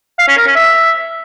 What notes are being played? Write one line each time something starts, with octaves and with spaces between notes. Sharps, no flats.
F5
C#4
A#4
C#4
E5